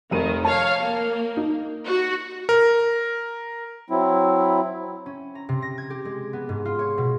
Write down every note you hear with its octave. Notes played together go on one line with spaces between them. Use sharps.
F1 D#3 D#7
C#5 F5 A5
A#3
D#4
F#4
A#4
F#3 C4 E4
C#4
A#5
C3
A#6
G#6
G4
G#3
B3
G#2
F4
C#5
B2